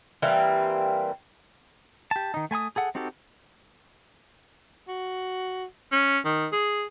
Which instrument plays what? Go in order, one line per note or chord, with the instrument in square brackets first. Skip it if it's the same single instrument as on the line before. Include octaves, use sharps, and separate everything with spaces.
[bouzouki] E3 G3 A#3 C4
[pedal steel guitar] G4 A5
D#3 D#4
A3 G#5 B5 D#6
G#4 A4 F#5
C4 D#4 F#4 G4 A4
[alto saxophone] F#4
C#4
D#3
G#4